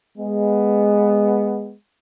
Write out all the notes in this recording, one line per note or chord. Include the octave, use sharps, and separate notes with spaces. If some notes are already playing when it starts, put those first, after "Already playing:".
G#3 B3